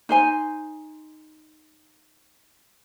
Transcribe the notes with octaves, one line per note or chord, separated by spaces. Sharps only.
D#4 C5 G#5